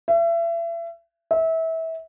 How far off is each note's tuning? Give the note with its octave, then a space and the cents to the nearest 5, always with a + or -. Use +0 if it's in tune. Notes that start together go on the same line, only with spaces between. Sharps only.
E5 +35
E5 -25